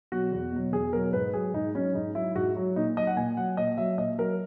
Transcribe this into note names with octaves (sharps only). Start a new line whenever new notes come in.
B2 F#3 F#4
E2
B2 F#3
E2 G#4
B2 F#3 A#4
G#2 B4
F#3 G#4
G#2 D#4
F#3 C#4
G#2 D#4
F#3 E4
G#2 F#4
F#3 F#4
A#2 D#4
F#3 D#5
F#5
A#2 G#5
F#3 F#5
A#2 D#5
F#3 E5
A#2 D#5
F#3 A#4